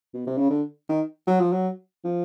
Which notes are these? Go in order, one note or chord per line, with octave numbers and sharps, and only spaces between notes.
B2
C3
C#3
D3
D#3
F#3
F3
F#3
F3